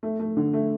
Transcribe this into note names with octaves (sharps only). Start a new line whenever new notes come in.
A3
A3
D3
A3